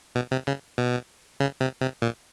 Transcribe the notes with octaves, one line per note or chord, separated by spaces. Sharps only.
B2
C3
C#3
B2
C#3
C3
C3
A#2